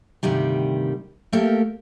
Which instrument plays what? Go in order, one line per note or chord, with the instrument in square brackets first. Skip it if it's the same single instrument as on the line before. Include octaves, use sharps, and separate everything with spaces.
[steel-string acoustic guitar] D2 G2 C3 D#3 G3
A3 A#3 G4 A4 A#4